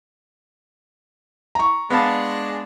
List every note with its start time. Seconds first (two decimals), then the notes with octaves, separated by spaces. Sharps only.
1.55 A#5 C#6
1.90 G#3 B3 D4 F5 A5